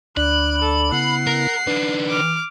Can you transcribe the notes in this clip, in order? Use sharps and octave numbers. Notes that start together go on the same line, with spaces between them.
D2 D4 D5 B5 F#6
A4
C#3 B3 E4 F#5 C7
A#4
D#3 D4 B4
D6 F6